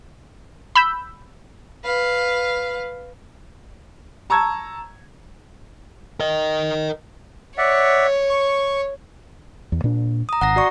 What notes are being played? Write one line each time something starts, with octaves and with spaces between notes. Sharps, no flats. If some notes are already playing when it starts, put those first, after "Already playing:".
B5 E6 G6
B4 F5
A5 A#5 C#6 E6 G#6
A#4 D#5
C#5 D5 E5 F#5
C#6
E2
A#2 D4
A#5 D#6
G#1 F#5 A#5 A#6
F#4 D5 C#6